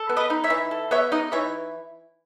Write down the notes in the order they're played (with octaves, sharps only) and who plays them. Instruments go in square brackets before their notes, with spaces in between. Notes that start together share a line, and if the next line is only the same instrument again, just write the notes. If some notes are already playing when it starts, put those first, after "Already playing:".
Already playing: [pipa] A4
B3
[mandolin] B4 D#5
[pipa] D#4
[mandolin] C#5 E5
[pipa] E3
A4
[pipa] B3 [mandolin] C#5 E5
[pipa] D#4 [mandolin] D#5 F#5
[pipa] E3 [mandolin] C#5 E5